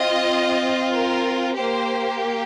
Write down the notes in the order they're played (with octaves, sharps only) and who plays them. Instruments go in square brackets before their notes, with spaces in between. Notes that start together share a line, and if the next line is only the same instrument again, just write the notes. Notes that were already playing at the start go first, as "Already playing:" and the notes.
Already playing: [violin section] C4 F4 D#5
A#4
A#3 G4 C5